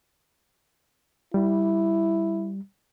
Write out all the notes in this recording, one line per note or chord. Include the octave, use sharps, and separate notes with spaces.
G3 E4